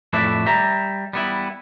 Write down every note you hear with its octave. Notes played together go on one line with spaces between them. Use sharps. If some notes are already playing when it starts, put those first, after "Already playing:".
F2 A2 E4 B4 D5 E5
G3 E5 A#5
G3 B3 E4